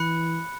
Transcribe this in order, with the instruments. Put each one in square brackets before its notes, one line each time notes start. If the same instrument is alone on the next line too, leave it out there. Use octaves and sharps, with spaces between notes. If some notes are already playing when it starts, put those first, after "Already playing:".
Already playing: [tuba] E3 [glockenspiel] B5 F#6 C#7